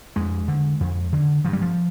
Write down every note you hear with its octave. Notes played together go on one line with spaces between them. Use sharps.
F2 G#3
D3
F2
D3
G2 F3
G3
F3